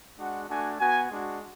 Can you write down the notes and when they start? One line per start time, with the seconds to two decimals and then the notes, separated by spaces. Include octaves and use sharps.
0.19 G#3 D4 F#4 F#5
0.49 A3 D4 F#4 G#5
0.80 B3 F#4 G#5
1.11 G#3 D4 F#4